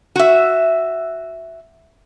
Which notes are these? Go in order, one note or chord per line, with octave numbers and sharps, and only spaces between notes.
F#4 E5